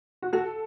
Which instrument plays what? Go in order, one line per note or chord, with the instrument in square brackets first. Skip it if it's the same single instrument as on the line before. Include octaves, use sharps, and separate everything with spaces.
[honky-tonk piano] F#4
[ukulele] F#4 [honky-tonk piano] A4